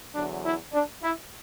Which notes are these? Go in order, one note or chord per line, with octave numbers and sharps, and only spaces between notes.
E2 D3 F#3 D4
E4
D4
E4